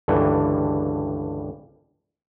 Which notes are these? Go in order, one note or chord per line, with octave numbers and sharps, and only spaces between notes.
C#2 G2 D3 E3 G3